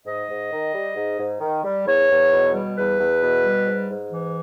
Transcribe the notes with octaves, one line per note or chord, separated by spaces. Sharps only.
G#2 D#5
G#2
D#3
G3
G#2
G#2
D#3
G3
E2 C#5
E2
B2
G3
E2 B4
E2
B2
G3
G#2
G#2
E3